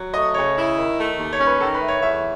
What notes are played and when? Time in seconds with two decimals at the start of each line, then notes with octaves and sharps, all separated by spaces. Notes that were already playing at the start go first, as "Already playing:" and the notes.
Already playing: F#3
0.13 A3 D#5
0.34 C#3 C#5
0.56 E4
0.77 D#3
0.97 A3
1.19 D#2
1.33 C#5
1.39 C#4
1.47 B4
1.60 D#3 A4
1.74 B4
1.81 A3
1.88 C#5
2.02 E2 E5